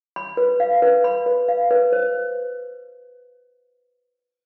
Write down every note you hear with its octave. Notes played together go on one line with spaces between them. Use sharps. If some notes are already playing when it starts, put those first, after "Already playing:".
B5
B4
F5
B4
B5
B4
F5
B4
C5